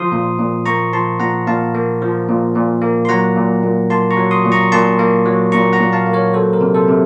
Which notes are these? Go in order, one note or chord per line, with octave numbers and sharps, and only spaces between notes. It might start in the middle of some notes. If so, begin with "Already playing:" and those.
Already playing: F3 C6 D#6
A#2
A#2
A#3 A#5 C#6
F3 A5 C6
A#2 F#5 A#5
A#2 F5 A5
A#3
F3
A#2
A#2
A#3
C6
F#3 F#5 A#5
A#2
A#2
A#3 A5 C6
A#5 C#6
F#3
C6 D#6
A#2
A#5 C#6
A#2 A5 C6
A#3
F#3
A#2 A#5 C#6
F#5 A#5
A#2
F5 A5
A#3
A#4 C#5
F#3 A4 C5
A#4
C3
A4 C5
C3